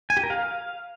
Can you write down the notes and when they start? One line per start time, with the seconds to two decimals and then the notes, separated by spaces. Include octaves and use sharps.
0.10 G#5
0.17 G4
0.23 A#4
0.30 F5